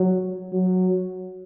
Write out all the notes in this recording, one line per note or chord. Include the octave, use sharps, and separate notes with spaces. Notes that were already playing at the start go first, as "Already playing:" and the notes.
Already playing: F#3
F#3